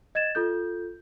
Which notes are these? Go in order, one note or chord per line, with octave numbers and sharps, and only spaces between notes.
D#5 G#6 A6 E7
F4 A4 G6